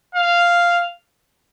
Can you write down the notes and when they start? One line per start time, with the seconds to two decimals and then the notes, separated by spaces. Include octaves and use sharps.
0.15 F5